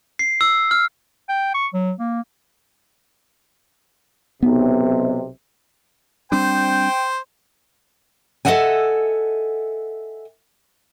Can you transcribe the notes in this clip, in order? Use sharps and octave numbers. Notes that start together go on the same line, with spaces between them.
C7
E6
F6
G5
C#6
F#3
A#3
B1 C3 B3
G3 C4 D4 C5 G5
A4 A#4 D#5 E5 F#5 G#5